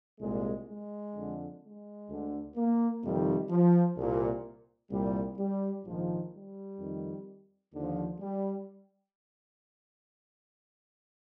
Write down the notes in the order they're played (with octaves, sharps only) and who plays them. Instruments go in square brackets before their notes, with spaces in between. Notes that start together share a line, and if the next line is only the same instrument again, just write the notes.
[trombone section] C2 A#2 G#3
G#3
F2 D3
G#3
D2 D3
A#3
F2 C3 D#3 G3
F3
C2 A#2
C2 A#2 G3
G3
A#1 G#2 D#3 F3
G3
F2 D#3
D#2 D3 F3
G3